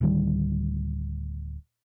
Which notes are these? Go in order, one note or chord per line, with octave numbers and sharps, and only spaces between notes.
D1 D2 D#3 G3